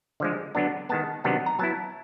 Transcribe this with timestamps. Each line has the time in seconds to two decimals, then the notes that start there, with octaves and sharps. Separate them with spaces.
0.20 D3 F3 G#3
0.55 D3 F#3 B3 D4
0.89 D#3 G#3 B3 A5
1.24 C3 D#3 F#3 B3 D4
1.46 A#5
1.59 F#3 B3 E4 A5